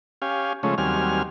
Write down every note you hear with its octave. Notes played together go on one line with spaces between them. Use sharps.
C#4 G4 F5 G#5
C#3 F3 G#3 A3 C#4
D#2 F#3 G3 C4 G#5 F6